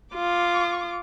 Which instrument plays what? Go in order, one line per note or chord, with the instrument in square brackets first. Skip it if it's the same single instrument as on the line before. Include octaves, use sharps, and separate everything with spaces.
[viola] F4 D6